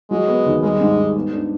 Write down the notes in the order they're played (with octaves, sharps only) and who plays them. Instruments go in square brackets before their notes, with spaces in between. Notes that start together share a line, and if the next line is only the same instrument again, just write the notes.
[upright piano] F#3 [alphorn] G#3
[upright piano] B3
D#2
[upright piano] G3 [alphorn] G#3
[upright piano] G#2
G#2
B3
D4